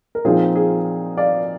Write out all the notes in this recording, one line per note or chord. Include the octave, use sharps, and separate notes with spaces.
A#4
A#2 F3 C4 D#4 F4 G#4
F4 G#4
D5 F5